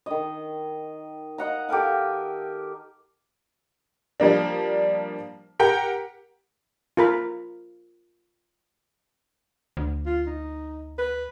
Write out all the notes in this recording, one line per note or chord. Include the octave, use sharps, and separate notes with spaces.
D#3 D#5
D#5 F#5 A#5
G4 A4 A#4 F5
F3 G3 A#3 D4
G4 A#4 F#5 G5
F4 A#4 B5
D2
F4
D#4
B4